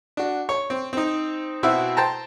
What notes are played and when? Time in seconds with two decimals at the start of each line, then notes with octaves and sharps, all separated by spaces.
0.17 D4 F#4
0.49 C#5
0.70 C4
0.93 C4 D#4
1.63 B2 C4 E4 F#4 E5
1.97 C5 G5 A5 A#5